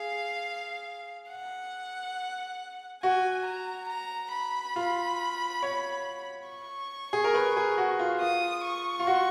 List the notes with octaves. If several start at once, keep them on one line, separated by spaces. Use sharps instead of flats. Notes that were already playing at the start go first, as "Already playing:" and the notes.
Already playing: G#4 F5
F#5
F#4 G#5
A#5
A#5
B5
F4
C#5
C#6
G#4
A#4
B4
G#4
F#4
F4
F4 D#6
C#6
F4
F#4